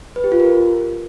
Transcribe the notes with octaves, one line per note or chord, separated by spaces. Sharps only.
B4
G4
F4
A#4